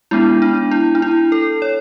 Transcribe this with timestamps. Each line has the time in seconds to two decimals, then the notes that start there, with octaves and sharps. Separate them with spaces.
0.11 G#3 B3 D4 E4
0.42 D4
0.71 E4
0.95 D4
1.02 E4
1.32 A4
1.62 C#5